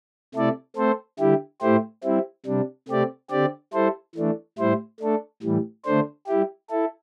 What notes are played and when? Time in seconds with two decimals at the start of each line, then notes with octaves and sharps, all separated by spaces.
0.34 C3 A3 E4 A4 D5
0.76 A3 C4 A4 C5
1.19 D3 G3 E4 G4
1.61 A2 A3 E4 G4 C5
2.04 G3 C4 E4
2.46 C3 G3 D4
2.88 C3 A3 C4 G4 D5
3.30 D3 C4 G4 D5
3.73 G3 E4 A4 C5
4.15 E3 A3 D4
4.58 A2 G3 E4 C5
5.00 A3 D4 A4
5.42 A2 E3 G3
5.85 D3 A3 D4 C5
6.27 G3 E4 G4
6.70 E4 A4